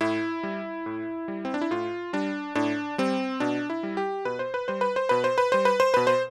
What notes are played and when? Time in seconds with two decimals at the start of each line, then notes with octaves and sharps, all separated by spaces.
0.01 A2 E4
0.43 G3
0.86 A2
1.28 G3
1.45 C4
1.54 D4
1.61 E4
1.71 A2 F4
2.13 G3 D4
2.55 A2 D4
2.98 G3 C4
3.40 B2 D4
3.70 E4
3.83 G3
3.97 G4
4.25 B2 B4
4.39 C5
4.54 B4
4.68 G3 C5
4.81 B4
4.96 C5
5.09 B2 B4
5.24 C5
5.38 B4
5.52 G3 C5
5.65 B4
5.80 C5
5.94 B2 B4
6.07 C5